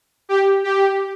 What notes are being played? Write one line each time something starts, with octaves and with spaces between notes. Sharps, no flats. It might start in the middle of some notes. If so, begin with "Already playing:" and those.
G4
G4